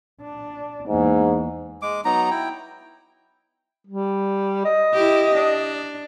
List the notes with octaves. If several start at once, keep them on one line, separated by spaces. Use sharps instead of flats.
D4
E2 G#2 A#3
G#3 D6
F#3 B3 D#4 A#5
E4 G5
G3
D#5
E4 G4
D4